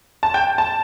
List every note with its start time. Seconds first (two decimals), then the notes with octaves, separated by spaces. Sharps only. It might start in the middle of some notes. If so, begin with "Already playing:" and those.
0.23 A5
0.34 G5
0.58 A5